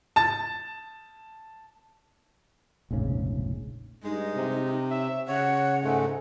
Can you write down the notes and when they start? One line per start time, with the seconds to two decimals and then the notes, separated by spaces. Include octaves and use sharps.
0.16 A5 A6
2.91 F1 A#1 G#2 C#3
4.04 G2 G#3 D#4
4.36 C3
4.91 C#5 E5
5.28 C#3 C#5 F#5
5.83 G#2 G#3 A3